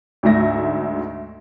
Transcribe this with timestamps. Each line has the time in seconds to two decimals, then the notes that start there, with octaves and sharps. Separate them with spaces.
0.23 D2 G#2 A3 E5 A#6